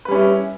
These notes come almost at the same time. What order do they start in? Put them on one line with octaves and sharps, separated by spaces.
B4 G3 C#4 E4